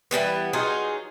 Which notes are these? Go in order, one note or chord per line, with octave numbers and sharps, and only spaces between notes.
E3 F#3 G3 B3
F#3 D#4 F4 G#4